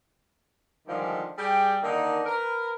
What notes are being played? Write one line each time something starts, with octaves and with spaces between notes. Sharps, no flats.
D3 D#3 F3 G3 G#3
G3 G#4 D5 G5
D3 D#3 A#3 D#4
A#4 B4